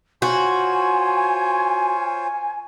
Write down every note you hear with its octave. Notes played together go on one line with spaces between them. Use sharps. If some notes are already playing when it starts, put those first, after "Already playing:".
F4 F#4 C5 C#5 G#5